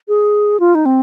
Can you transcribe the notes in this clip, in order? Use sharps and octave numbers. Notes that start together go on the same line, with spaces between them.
G#4
F4
D#4
C4